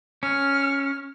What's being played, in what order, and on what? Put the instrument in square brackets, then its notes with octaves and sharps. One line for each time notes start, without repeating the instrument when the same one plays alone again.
[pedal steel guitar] C#4 [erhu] F6